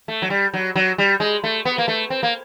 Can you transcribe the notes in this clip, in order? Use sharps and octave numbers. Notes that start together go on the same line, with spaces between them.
A3
F#3
G3
F#3
F#3
G3
G#3
A3
B3
A#3
A3
C4
A#3